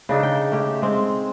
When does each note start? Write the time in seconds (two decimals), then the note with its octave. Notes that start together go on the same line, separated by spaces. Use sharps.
0.09 C#3 D4 D#4 A4
0.23 G5
0.52 A3 C#4 G4
0.82 G#3 C4